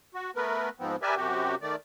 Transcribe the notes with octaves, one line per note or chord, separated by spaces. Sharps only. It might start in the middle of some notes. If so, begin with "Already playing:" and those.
F#4
A3 B3 A#4 B4
G#2 F3 B3 C4
G4 A#4 B4 D5 E5 G#5
F#2 C3 F#4 G4
D#3 A3 D5